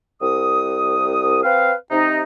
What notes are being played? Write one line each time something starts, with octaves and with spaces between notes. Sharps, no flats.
C2 D#6
C4 B4 F5
C3 D#4